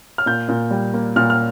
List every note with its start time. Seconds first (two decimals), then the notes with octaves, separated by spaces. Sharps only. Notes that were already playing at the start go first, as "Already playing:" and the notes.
0.18 F6
0.26 A#2 G6
0.49 A#2
0.71 G3
0.94 A#3
1.16 A#2 F6
1.30 F6